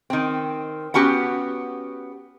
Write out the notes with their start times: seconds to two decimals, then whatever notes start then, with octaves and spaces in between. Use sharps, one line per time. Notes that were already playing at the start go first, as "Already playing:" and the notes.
0.10 D#3 C4
0.94 B3 C#4 F#4 G4